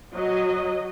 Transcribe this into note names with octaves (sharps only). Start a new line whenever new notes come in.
F#3 D#5